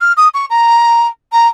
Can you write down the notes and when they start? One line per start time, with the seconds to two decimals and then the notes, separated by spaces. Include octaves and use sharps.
0.01 F6
0.17 D#6
0.34 C#6
0.50 A#5
1.32 A#5